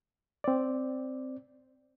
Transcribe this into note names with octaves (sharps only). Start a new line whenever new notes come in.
C4 D5